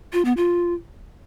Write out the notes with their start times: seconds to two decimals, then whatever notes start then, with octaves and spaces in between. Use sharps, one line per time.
0.13 F4
0.25 B3
0.37 F4